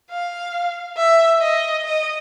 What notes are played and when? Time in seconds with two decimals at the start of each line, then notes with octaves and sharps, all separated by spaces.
0.10 F5
0.97 E5
1.41 D#5
1.85 D#5